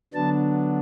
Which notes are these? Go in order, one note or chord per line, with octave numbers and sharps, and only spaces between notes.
D3 F#3 B3 D4 A5